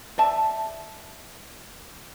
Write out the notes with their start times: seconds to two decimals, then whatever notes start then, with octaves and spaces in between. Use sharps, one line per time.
0.18 D5 E5 A5